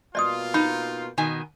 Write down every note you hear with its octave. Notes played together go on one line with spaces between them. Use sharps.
B2 A#3 F4 D5 D#5 D#6
D#4 B5
B2 D#3 G#5